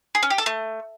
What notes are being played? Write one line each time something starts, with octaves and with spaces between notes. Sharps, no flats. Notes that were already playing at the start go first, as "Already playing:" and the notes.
G#4
C#4
G4
A4
A3